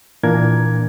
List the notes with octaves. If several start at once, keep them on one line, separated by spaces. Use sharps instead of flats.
A#2 E3 A#3 D4 A#4 G#6